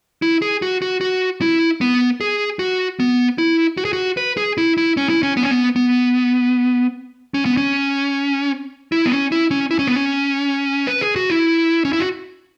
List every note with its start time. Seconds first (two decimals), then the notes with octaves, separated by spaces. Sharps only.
0.22 E4
0.42 G#4
0.62 F#4
0.82 F#4
1.01 F#4
1.41 E4
1.81 B3
2.21 G#4
2.59 F#4
3.00 B3
3.38 E4
3.77 F#4
3.85 G#4
3.93 F#4
4.17 B4
4.37 G#4
4.58 E4
4.77 E4
4.97 C#4
5.09 E4
5.23 C#4
5.37 B3
5.43 C#4
5.51 B3
5.76 B3
7.34 C#4
7.45 B3
7.57 C#4
8.92 E4
9.06 B3
9.12 C#4
9.32 E4
9.51 C#4
9.71 E4
9.79 C#4
9.87 B3
9.96 C#4
10.87 B4
11.01 G#4
11.16 F#4
11.30 E4
11.85 C#4
11.93 E4
12.00 F#4